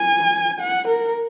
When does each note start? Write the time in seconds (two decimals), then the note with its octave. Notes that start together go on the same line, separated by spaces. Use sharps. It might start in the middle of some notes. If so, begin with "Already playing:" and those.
Already playing: G#5
0.61 F#5
0.88 A#4